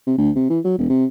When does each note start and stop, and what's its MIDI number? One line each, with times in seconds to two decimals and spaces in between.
0.07 0.17 48
0.18 0.31 38
0.36 0.48 48
0.50 0.59 52
0.65 0.77 54
0.78 0.88 28
0.90 1.05 48